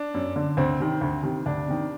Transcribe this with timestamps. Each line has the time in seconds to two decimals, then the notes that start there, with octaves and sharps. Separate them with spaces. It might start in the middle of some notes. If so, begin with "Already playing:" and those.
Already playing: D4
0.14 F#2
0.36 D3
0.57 D2 C4
0.80 C3 D#3
1.01 D2
1.23 C3 D#3
1.46 D2 D4
1.67 C3 D#3